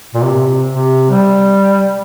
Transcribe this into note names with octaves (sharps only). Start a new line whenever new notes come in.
A#2
C3
C3
G3